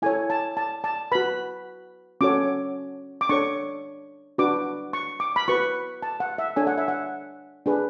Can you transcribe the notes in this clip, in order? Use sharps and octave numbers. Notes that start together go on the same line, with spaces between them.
E4 A4 C#5 G#5
A5
A5
A5
F#4 B4 B5
C#4 F#4 A4 C#5 D6
D6
D4 A4 C#5 C#6
D4 F#4 B4 D6
C#6
D6
B5
F#4 B4 C#6
A5
F#5
E5
D4 A4 C#5 G#5
F#5
E5
F#5
D4 G#4 B4